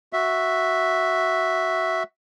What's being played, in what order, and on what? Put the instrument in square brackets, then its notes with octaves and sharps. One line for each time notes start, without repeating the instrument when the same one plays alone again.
[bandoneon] F#4 E5